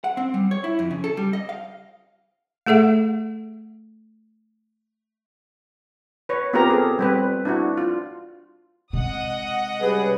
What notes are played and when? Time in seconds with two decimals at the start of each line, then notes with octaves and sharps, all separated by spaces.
0.04 F#5
0.17 C4
0.34 G3
0.51 C#5
0.64 E4
0.79 F2
0.91 C#3
1.04 A4
1.17 G3
1.33 D#5
1.49 F5
2.66 A3 G#4 A4 E5 F#5
6.29 B4 C#5
6.53 B3 C4 F4 G4 A#4 A#5
6.70 G#4 A4
6.99 G3 C4 B4
7.45 D4 E4 F#4
7.77 F4
8.93 C3 G#3 D#5 F#5 D#6
9.81 G3 C#4 G#4 B4